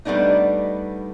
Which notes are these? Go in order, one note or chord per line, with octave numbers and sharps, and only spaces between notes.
G3 A3 B3 D4 D#4